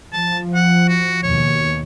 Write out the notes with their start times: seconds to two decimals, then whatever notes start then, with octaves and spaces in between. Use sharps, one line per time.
0.13 F3 A5
0.55 F#5
0.88 F#4
1.23 D#2 B2 C#5